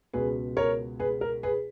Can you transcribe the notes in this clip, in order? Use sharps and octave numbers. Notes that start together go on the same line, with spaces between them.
C#2 B2 G#3 B3 G#4 B4
A#4 C#5
G#4 B4
A#4
G#4 B4